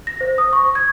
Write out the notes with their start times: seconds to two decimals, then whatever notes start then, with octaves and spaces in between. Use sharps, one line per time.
0.07 A#6
0.21 C5
0.38 D#6
0.53 C#6
0.75 G#6